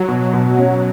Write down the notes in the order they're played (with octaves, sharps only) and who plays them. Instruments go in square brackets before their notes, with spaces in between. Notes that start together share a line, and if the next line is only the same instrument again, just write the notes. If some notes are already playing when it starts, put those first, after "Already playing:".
Already playing: [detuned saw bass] F#3
[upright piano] B2
B2
C#4